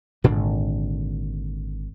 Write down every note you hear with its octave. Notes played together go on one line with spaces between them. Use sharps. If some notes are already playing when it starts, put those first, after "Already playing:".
G#1 A#2 D3 D4